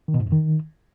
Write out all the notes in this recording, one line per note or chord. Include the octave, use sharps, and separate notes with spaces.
D#3
B2
G#2
F2
D#3